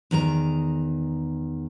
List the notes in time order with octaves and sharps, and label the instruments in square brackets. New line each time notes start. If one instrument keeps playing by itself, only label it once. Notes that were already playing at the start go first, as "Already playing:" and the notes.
[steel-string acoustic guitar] E2 D#3 A#4 A#5